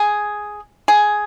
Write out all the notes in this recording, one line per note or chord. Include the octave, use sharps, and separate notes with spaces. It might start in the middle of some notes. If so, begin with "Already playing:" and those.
Already playing: G#4
G#4